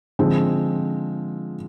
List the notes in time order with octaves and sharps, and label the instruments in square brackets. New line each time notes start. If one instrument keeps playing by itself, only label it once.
[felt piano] D3 F3 G#3 C4